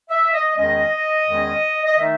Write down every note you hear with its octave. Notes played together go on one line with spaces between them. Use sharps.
E5
D#5
E2 D#3 G#3 C#4 D#5
E2 D#3 G#3 C#4
D#5
D#3 A3 D#4 E5